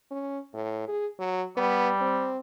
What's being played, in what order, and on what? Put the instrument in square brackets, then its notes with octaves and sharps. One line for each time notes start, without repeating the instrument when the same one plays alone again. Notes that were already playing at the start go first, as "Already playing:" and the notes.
[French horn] C#4
A2
G#4
F#3
[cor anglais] G3 [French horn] B3
[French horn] C4